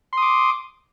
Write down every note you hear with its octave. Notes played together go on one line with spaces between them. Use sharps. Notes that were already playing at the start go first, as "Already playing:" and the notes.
C6 D6 D#6